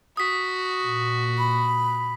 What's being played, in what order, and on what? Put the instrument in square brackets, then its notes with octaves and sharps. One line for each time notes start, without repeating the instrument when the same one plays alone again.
[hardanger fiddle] F#4 [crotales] D#6 B6
[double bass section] A#2
[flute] B5